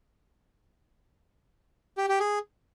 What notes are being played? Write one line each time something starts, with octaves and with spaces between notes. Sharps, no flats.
G4
G4
G#4